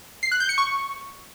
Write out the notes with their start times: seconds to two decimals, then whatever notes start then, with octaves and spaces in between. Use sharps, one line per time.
0.23 C7
0.32 F#6
0.40 G6
0.49 C#7
0.58 C#6